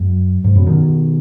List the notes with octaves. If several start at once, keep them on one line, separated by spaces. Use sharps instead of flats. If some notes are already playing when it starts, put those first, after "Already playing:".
Already playing: F#2
G#2
F#2 B2
B2 D#3